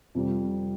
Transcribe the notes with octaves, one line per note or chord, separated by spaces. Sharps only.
F2 C3 G3